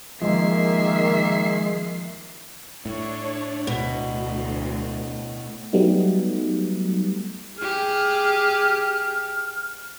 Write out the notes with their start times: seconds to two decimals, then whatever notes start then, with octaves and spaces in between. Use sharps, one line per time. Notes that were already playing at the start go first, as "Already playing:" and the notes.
0.22 D#3 F3 G#3 A#3 E5 C7
2.86 A2 D4 C#5
3.67 D2 B2
5.73 F#3 G3 A3 B3 D#4
7.58 G4 G#4 F6